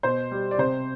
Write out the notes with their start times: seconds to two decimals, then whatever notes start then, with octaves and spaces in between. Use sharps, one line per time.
0.03 B2 C5
0.31 G3
0.51 D5
0.58 C3 C5